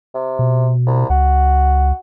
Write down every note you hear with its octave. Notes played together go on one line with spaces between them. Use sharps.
C3
B2
C2
C#2 F#4